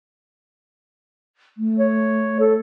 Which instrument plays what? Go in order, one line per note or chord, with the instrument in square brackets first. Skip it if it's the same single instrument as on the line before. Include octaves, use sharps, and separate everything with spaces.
[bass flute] A3
[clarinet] C#5
A4